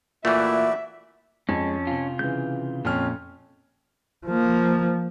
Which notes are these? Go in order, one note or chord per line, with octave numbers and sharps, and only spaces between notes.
A#2 E3 A3 E4 F#4 D5 E5
F2 G#3 C#4
C3 F4
C#3 E3 G6
F2 A#2 C#4 F6
F3 A#3